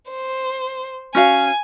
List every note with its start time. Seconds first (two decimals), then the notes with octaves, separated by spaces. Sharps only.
0.10 C5
1.15 C#4 F#4 F5 G#5